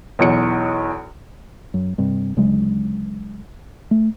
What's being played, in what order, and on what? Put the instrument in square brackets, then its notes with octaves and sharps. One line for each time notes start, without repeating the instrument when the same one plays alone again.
[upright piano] B1 E2 C#7
[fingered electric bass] F#2
G2 C3
D2 C#3 F#3 G#3
A3